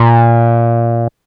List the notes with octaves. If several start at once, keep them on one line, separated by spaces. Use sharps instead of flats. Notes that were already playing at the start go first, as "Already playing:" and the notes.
Already playing: A#2